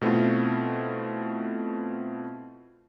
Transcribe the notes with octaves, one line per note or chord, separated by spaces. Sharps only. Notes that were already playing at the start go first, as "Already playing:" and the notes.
B2 A3 C4 E4 F4